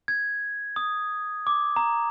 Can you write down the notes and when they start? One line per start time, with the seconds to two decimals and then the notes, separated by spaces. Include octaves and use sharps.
0.08 G#6
0.76 D#6
1.47 D6
1.76 A#5